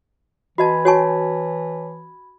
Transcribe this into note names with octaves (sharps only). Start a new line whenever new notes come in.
E3 F#4 D#5 A5 B5 G#6
F#4 C#5 G#5 A5 C#6